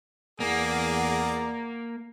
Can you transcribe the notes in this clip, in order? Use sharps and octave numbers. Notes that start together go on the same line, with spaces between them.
E2 A#3 G#4 A#4 D5 F#5